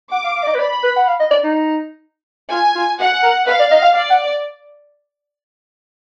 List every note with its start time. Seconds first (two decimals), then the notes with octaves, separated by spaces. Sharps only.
0.11 F#5 D6
0.24 F5
0.35 F5
0.43 D5
0.47 D#5
0.54 B4
0.59 D5 B5
0.83 B4
0.96 F#5
1.08 F5
1.20 D#5
1.31 D5
1.44 D#4
2.51 F4 G#5
2.76 F4
2.99 F#4 F#5
3.23 A#4
3.47 B4 F5
3.59 D5
3.71 D#5
3.83 F5
3.95 D5 F5
4.10 F#5